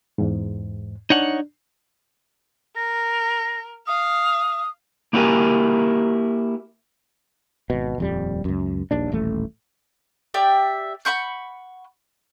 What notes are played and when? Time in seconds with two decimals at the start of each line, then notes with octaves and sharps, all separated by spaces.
0.18 E2 G#2
1.10 D4 D#4 C#5 F#5
2.76 A#4 A#6
3.87 F5 D#6
5.13 A#3 E4 F#4 G4 A#4 G#5
7.70 G#1 B2
7.98 D#1 F2 G3
8.45 C#2 F#2
8.91 D#1 A#1 D#2 D4
9.12 D#1 A1 A3
10.34 G4 D5 E5 G5
11.05 F#5 B5 C#6 G6